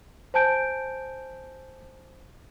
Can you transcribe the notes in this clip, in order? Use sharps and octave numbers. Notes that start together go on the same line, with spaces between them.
C5 G#5 A5 G6 D7